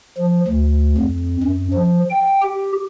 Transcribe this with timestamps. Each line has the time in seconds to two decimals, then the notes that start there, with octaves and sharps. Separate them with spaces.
0.18 F3
0.47 D2
0.97 F2
1.43 F#2
1.73 F3
2.10 G5
2.42 G4